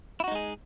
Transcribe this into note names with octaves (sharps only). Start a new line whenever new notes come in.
G#3 D#4 E4 F#4 G#4